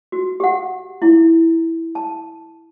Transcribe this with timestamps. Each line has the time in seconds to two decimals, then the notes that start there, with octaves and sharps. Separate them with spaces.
0.12 F#4
0.40 G4 F#5
1.02 E4
1.95 A5